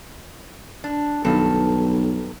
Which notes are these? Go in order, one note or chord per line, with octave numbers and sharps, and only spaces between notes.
D4
B1 G2 D#3 A4